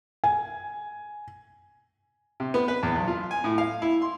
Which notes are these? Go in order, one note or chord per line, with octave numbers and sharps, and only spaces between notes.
G#5
C3
B3
B4
E2
B1
F4
G#5
A2
F5
E4
C6